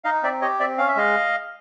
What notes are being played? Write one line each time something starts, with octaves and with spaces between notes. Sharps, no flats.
D#4 D#5 F5
C4 D5 E5
G4 C#5 D#5
C4 D5 E5
C#4 F5
E5
G#3 D#5 F5